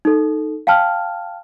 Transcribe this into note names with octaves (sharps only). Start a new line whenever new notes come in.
D#4 A4
F5 G5 A5 F6